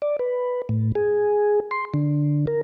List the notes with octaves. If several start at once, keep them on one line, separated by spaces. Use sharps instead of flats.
D5
B4
A2
G#4
C6
D3
A#4